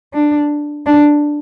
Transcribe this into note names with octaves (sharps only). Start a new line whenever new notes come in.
D4
D4